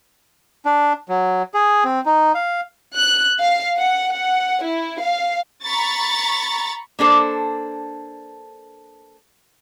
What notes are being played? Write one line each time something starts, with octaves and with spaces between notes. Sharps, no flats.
D4
F#3
G#4
C4
D#4
F5
F#6
F5
F#5
F#5
E4
F5
A#5 B5 C#6 A6
A#3 D4 A4 C5